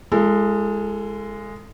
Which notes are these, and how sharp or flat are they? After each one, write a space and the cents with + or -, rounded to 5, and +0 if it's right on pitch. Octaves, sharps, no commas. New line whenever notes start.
G#3 -5 F4 -45 A4 +20